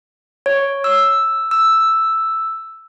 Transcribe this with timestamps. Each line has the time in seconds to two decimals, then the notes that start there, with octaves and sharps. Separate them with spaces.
0.46 C#5
0.84 E6
1.51 E6